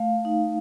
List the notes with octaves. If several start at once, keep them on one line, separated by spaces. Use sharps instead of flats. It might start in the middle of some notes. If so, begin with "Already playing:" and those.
Already playing: A3 F5
D#4